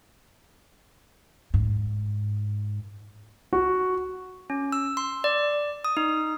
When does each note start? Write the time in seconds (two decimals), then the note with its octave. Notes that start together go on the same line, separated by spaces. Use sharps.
1.54 G#2
3.53 F#4
4.50 C#4
4.72 E6
4.97 C6
5.24 D5
5.84 D#6
5.97 D#4